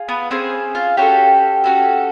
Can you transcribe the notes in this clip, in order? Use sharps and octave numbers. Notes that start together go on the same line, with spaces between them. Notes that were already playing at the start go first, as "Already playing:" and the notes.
Already playing: F4 G#4
B3 B4
C4 C#4 G#4 C5
F4 F5
C#4 F#4 G4 A4 G5
C#4 F#4 A4